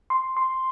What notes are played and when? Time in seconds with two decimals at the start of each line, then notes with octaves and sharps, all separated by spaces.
0.10 C6
0.37 C6